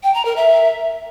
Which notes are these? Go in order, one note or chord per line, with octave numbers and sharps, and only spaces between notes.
G5
A#5
A#4
E5